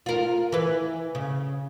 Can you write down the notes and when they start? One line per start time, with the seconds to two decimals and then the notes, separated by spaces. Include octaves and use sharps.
0.06 F4 A#4
0.52 E3 B4
1.15 C#3